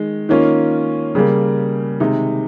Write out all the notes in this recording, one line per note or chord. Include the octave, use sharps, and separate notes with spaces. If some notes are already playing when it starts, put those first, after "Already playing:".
Already playing: D#3 G#3
D#3 A#3 C#4 F4
C#3 G3 A#3
C3 D#3 G#3 D#4